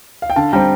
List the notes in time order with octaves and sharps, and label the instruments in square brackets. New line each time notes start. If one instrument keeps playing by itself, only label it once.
[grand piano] F5
G5
[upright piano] D3 [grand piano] F5 A5
[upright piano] G3 C4 [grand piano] G5 A#5